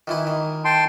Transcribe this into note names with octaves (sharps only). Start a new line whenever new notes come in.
D#3 E3 E4
D#3
G5 A5 C6